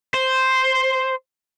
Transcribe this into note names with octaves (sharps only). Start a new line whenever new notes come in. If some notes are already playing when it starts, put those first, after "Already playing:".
C5